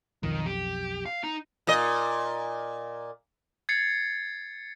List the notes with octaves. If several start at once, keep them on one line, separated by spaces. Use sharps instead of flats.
B1 F2 D#3
G4
F5
D#4
A#2 D#5
G#6 A6 C7 C#7